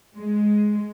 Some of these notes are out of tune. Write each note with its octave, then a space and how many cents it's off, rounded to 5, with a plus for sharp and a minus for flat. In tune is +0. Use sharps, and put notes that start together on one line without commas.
G#3 +5